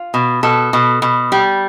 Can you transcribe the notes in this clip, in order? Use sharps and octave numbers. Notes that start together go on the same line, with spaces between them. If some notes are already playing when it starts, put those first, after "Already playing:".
Already playing: F4
B2
B2 A4
B2
B2
G3